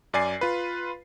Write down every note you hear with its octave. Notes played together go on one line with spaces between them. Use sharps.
F#2 D5 G#5 C7
F4 B4